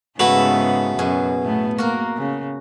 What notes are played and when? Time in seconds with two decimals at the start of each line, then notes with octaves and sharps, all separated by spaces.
0.20 G#2 C#3 A3 B3 E4 F#4 B4 E5
0.99 F#2 B2 G#4
1.43 A2 A3 B3
1.78 A#3 F#4 A#4
2.17 C#3